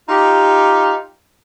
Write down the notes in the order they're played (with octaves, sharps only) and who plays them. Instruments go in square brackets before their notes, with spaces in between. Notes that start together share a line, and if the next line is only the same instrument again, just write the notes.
[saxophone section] D#4 F4 G4